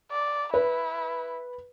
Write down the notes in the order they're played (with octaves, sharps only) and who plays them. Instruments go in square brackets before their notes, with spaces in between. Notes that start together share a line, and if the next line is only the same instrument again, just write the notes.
[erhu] D5
[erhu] E4 [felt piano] B4